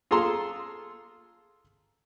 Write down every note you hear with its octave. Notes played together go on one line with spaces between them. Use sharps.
F4 G#4 A4 A#5 C6